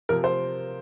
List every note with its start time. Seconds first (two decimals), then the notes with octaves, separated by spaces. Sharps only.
0.09 C3 F3 A#4
0.24 C5